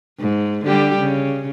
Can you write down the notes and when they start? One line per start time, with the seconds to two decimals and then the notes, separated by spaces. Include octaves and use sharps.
0.20 G#2
0.65 D3 G3 G4
0.99 C#3